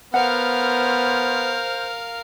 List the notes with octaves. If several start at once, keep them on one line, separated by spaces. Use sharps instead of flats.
B3 A#4 C5 F5 F#5